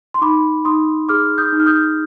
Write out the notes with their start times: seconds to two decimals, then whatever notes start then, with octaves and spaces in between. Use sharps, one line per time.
0.14 C6
0.22 D#4 B5 D6
0.65 D#4 C6 D#6
1.09 G#4 D6 F6
1.38 D#6 G6
1.53 D#4
1.60 F6
1.66 D#6 G6